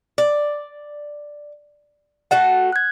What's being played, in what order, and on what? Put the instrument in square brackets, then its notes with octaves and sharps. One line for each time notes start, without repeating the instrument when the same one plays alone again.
[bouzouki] D5
[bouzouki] A3 F#4 A5 [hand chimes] F#5
[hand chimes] F#6 G#6